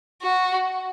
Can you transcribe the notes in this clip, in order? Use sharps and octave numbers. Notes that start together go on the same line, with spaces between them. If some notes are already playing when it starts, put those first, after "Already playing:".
F#4